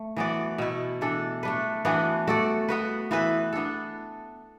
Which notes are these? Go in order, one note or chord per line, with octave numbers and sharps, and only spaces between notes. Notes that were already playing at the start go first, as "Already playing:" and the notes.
Already playing: A3
E3 B3 F#4 D5
B2 A3 E4
E3 D4 A4
A3 D4 B4
E3 B3 D4 F#4
A3 F#4 A4 D5
B3 F#4 B4
E3 B3 E4 B4
B3 D4 A4